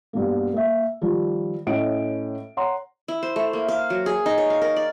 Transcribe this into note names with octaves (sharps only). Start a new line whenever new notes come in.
G2 B2 A#3
A#3 E5
D#3 F3 G3
A2 C#4 D#5 D7
C#5 F#5 A#5 C6
E4
C5
A3
A#3
F5
F#3
G#4
D#4
C#5
F5
A#4
D5